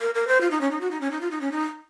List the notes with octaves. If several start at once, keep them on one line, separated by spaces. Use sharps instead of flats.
A#4
A#4
C5
F4
D#4
C#4
D#4
F#4
D#4
C#4
D#4
F4
D#4
C#4
D#4